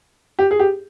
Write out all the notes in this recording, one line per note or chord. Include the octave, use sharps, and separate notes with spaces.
G4
G#4
G4